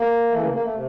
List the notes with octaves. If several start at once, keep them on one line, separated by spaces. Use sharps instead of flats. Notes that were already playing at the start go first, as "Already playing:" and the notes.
Already playing: A#3
C#3 E3 A3
A#3
A#3
A3
C3